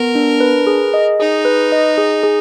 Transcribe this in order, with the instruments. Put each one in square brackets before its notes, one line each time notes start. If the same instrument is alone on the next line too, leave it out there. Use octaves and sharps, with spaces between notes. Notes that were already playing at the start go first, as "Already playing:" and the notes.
Already playing: [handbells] B3 [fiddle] A#4
[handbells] D4
B4
G#4
D#5
[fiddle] D#4 [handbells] G#4
[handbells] B4
D#5
G#4
G#4